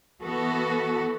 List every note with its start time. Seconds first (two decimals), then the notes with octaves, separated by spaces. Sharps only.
0.23 E3 B3 F#4 A4